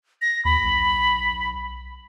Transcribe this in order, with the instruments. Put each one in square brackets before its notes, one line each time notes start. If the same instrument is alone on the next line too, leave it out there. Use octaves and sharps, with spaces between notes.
[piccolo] A#6
[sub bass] D#2 [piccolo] B5
[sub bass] B1